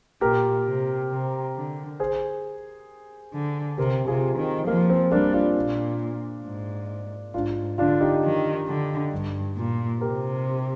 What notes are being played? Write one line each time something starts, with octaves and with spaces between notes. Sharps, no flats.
A#2 G4 A#4
C3
C3
D3
G#4 C5
D3
C3 G4 A#4
C3 F4 G#4
D#3 C4
F3 A#3
C4
G3 A#3 D4
D4 F4
A#2
G#2
G#2 D4 F4
D3 D4 F4
D#4 G4
D#3
D3
G2
A#2
C3 G4 A#4